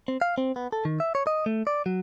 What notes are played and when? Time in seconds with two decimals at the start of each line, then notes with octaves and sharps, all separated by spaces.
0.08 C4
0.21 F5
0.38 C4
0.56 B3
0.72 A4
0.85 D#3
1.00 E5
1.15 C#5
1.27 D#5
1.46 A3
1.67 D5
1.86 F#3